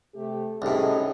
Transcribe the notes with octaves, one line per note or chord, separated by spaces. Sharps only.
C3 A3 G4
C2 A2 C#4 D#4 G#4